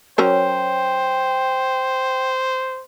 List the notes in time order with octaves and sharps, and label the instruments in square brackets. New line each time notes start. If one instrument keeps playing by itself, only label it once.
[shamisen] F#3 C#4 A#4 [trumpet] C5 [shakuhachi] G5